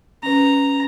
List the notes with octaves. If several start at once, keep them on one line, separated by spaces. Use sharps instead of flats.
C#4 B4 A#5